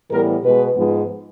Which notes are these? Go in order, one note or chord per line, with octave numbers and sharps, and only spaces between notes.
A2 E3 G3 B3 A#4
B2 G#3 B3 B4
G#2 F3 G#3 B3